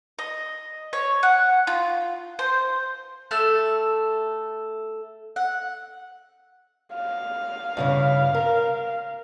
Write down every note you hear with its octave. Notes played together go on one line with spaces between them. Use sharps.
D#5
C#5
F#5
F4
C5
A3 A4 F6
F#5
F5
G2 C#3 E4
A#4